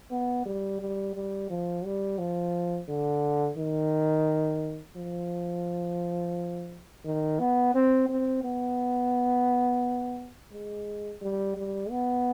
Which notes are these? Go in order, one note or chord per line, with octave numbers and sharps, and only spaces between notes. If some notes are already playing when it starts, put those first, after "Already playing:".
B3
G3
G3
G3
F3
G3
F3
D3
D#3
F3
D#3
B3
C4
C4
B3
G#3
G3
G3
B3